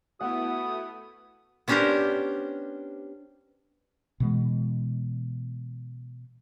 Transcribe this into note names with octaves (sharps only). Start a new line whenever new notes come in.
A3 B3 E4 F#4 F#5 D#6
B3 C#4 D4 G4 A#4 C5
B2 E3 G#3